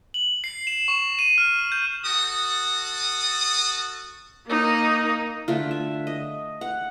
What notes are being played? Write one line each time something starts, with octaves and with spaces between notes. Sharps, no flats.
F#7
C7
E7
C#6
D#7
F6
G6
F#4 A4 D#6
A#3 D#4
D3 A3 F4
E5
D#5
F#5